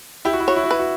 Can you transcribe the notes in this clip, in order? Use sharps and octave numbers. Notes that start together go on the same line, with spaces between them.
E4 G4
F#4
E4
F#4 C#5
E4
F#4
E4 B4
F#4